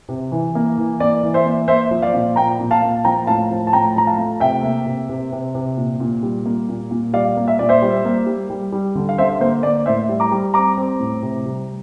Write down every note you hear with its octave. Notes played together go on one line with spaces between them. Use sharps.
C3
E3
A#3
E3
A#3 D5
E3
C5 E5
A#3
A#3 C5 E5
F3
D5 F5
A#2
A#3 G5 A#5
A#2
F5 A5
A#3
F3 G5 A#5
A2 F5 A5
F3
A5
A2 G5 A#5
F3 A#5
F5 A5
A3
C3 E5 G5
A#3
C3
C3
C3
C3
A#2
A#2
G3
A#3
A#2
A#2
G3 D5 F5
A#3
E5
A#2 D5
C5 E5
G3
A#3
G3
G3
G3
D3
F5
D3 C5 E5
A#3 C5
A#3 D5
A2 C5 E5
G3
A#5 D6
G3
C4 A#5 D6
C4
A2
C3
G3